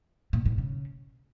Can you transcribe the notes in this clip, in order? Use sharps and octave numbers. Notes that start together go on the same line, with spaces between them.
A#2
G#2
C#3